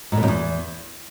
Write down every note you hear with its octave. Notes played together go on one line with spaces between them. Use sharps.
G#2
A2
F#2
E2